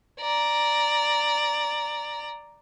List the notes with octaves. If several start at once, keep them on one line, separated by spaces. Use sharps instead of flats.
D5 A#5